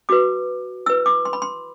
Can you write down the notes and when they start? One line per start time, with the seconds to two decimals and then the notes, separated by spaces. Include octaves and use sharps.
0.09 F#4 B4 D6
0.86 E4 B4 E6
1.06 D6
1.25 C6
1.33 B5
1.42 C6